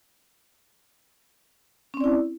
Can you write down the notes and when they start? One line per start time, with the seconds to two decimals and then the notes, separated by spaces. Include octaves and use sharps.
1.94 C#4
1.97 C4
2.01 D5
2.04 E4